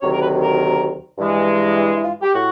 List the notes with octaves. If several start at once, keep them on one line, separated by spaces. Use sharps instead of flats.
D2 C3 D#3 F#3 C#5
A#4
B4
A#4
G2 E3 G#3
E4
E4
F4
G4
A2 F#4